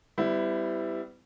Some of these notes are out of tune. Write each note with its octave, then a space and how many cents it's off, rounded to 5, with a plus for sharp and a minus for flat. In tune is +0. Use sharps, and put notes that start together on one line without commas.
G3 +0 B3 +45 E4 +0